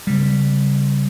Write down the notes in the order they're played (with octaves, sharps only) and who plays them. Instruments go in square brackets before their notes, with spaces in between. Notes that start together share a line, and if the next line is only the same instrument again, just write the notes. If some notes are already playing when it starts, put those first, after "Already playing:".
[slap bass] C#3 G3